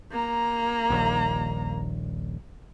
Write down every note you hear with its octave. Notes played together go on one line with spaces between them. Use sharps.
A#3 A#5
D#1 A#1 D#2